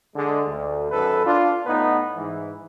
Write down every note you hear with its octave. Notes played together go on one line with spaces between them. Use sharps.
D3 G#3
D2
G#1 F#2 A4 B4
D4 F4
A2 B3 D#4 B4
G#2 E3